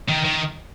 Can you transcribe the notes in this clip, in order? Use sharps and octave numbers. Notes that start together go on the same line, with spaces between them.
D#3
D#3